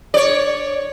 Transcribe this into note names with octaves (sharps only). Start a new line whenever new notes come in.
C#5 D5